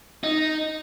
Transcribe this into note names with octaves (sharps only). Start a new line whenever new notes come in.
D#4